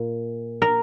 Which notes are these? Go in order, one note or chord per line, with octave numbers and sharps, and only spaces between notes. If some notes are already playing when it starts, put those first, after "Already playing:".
Already playing: A#2
A#4